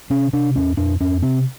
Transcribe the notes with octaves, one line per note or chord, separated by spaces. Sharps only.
C3 C#4
C3 D4
E2 C#4
F2 D4
F2 C#4
C3 C4